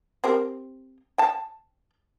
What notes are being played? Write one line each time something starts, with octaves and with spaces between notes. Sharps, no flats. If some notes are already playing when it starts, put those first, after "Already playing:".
C4 G4 A#4
G5 A5